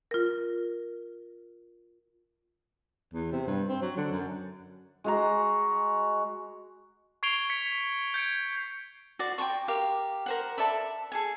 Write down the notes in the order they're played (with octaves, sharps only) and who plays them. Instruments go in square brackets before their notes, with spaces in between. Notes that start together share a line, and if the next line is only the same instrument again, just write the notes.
[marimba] F4 A#4
[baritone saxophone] E2
C3
G2
C4
F#3
D3
F#2
[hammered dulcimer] G#3 F#4 A#5
[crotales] C#6 G#6 C7 D7 F7 G7
G#6 B6 C#7
G6 G#6 C#7 D7
[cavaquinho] F#4 C5 D5
G5 A5 C6 C#6
G4 A#4 F5
A#4 C5 F#5
A4 D5 E5 B5
G#4 A4 G#5